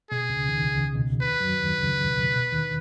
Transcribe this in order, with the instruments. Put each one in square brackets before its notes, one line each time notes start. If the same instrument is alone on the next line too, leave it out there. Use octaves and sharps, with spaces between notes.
[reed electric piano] B2 [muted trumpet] G#4
[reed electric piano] C#2 C#3
D#2 D#3
C#2 C#3
B2
[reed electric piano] D#2 D#3 [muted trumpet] B4
[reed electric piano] F#2 F#3
D#2 D#3
C#2 C#3
B2
B2
D#2 D#3